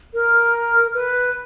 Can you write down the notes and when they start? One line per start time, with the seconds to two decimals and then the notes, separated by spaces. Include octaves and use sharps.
0.14 A#4
0.94 B4